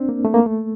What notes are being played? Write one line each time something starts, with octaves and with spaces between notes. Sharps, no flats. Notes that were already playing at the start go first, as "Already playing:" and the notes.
Already playing: C4 D4
A#3
A3
A#3
A3